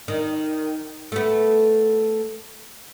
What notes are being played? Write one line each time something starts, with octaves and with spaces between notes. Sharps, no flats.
D#3
A3 B3